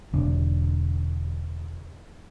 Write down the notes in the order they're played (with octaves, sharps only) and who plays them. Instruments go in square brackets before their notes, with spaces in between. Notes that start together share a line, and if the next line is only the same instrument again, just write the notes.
[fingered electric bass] E1 D3